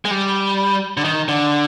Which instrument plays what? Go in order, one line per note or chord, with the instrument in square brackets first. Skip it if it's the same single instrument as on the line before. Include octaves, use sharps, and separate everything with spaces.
[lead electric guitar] G#3
G3
D3
D#3
D3